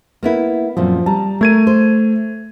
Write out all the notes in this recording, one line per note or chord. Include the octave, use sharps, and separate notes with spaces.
A#3 B3 E4
F#2 A#2 F3 C4
G3 A5 A#5
A3 A#4 G#6 D#7
C5